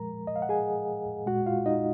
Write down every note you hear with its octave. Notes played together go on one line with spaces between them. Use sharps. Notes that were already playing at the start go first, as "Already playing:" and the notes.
Already playing: A#2 F3 G#3 A#4 A#5
D#5
F5
F#5
G#4 G#5
A#2 G#3 F#4 F#5
F4 F5
D#4 D#5